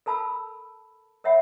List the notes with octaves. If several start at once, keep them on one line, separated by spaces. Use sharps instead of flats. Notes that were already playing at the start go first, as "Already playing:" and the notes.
A4 A#4 A5 B5 E6
A#4 C#5 E5 F#5 B5